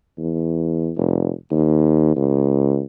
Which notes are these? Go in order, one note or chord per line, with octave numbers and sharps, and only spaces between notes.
E2
F1
D#2
C#2